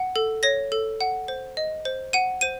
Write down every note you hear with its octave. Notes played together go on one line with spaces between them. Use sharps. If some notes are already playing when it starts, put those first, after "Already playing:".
Already playing: F#5
A4
C#5 A#6
A4
F#5
C5
D#5
C5
F#5 D#7
C5 D#7